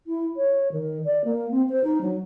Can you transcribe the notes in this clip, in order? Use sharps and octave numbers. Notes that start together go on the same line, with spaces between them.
E4
C#5
D#3
D5
A#3
C4
C5
D#4
F#3